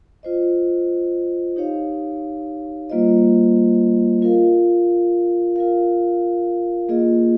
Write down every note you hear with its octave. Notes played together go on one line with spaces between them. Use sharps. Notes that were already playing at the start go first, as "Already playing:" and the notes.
F4 C5 D#5
D#4 G4 C#5 F5
G3 A#3 F4 C5 D#5
F4 A#4 F5
F4 A#4 F5
A#3 F4 G#4 D#5